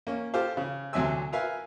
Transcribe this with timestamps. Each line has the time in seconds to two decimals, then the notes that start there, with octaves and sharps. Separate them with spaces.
0.07 A#3 C#4
0.34 F4 G4 A4 C5 F5
0.57 C#3
0.93 D2 C3 F#3 E5 G#5 E6
1.33 A#4 B4 E5 F5 G#5